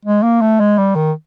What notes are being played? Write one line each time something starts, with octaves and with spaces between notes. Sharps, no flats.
G#3
A#3
A3
G#3
G3
D#3